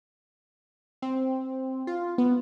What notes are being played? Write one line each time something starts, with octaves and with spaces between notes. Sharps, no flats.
C4
F4
B3